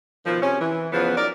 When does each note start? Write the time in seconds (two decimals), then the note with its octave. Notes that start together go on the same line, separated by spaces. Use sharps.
0.26 B2 D#3 F3
0.42 C3 C#4
0.61 E3
0.93 E2 C#3 F3 B3
1.17 F#3 D#4 A#4 D5